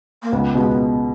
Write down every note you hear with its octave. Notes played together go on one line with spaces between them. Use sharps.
A#3
C#2 B3
B2 G#3 B3 D#4